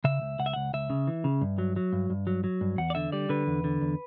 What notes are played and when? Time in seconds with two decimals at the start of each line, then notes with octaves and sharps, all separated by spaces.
0.04 C#3 E5
0.22 C#2
0.39 C#2 F#5
0.46 E5
0.53 C#2 F#5
0.74 C#2 E5
0.90 C#3
1.07 E3
1.24 C#3
1.41 G2
1.58 F#3
1.76 F#3
1.93 G2
2.10 G2
2.27 F#3
2.44 F#3
2.61 G2
2.78 E2 F#5
2.90 D5
2.95 D3 E5
3.12 G3 D5
3.29 D3 B4
3.47 E2
3.64 D3
3.81 E2